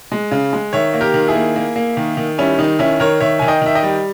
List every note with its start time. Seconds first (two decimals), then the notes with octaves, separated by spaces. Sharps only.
0.12 G#3
0.31 C#3
0.53 G#3
0.73 D#3 C#5 E5
0.94 A#3
1.01 G4 A#4
1.14 D#3
1.28 E4 G#4
1.34 A#3
1.56 A#3
1.76 A#3
1.97 D#3
2.17 D#3
2.38 G3 C#4 E4
2.59 D#3 D#4
2.79 D#3 C#4 E4
3.00 D#3 A#4 C#5
3.20 D#3 C#5 E5
3.39 D#3 G#5
3.48 D#5 G5
3.62 D#3 E5
3.75 D#5 G5
3.83 G3